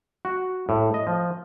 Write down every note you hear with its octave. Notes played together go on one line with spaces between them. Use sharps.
F#4
A2
D#5
F3